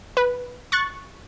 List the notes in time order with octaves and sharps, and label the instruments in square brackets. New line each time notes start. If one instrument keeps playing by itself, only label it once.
[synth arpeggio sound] B4
C#6 F#6 A6